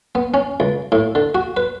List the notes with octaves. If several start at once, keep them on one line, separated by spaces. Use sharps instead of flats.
B3
C#4
C#2
A2
D3
F#4
B4